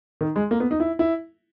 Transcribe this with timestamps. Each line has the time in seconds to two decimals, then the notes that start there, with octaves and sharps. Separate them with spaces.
0.21 D#3
0.36 G#3
0.51 A#3
0.60 B3
0.71 D#4
0.80 E4
0.99 E4